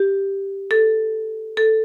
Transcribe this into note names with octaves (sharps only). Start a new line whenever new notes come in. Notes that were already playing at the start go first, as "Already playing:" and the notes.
Already playing: G4
A4
A4